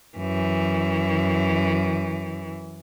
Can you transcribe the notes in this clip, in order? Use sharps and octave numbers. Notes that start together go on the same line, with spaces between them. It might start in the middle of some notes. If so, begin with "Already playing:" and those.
F#2 E3